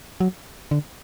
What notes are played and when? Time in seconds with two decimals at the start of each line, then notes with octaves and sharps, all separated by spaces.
0.20 F#3
0.71 D3